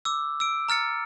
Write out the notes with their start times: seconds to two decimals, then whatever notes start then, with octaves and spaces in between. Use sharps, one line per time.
0.05 D6 E6
0.40 E6 D7
0.69 A#5 F6 A6 C#7